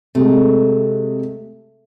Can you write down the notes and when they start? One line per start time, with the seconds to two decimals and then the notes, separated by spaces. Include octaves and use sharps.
0.15 C3 G#3 A3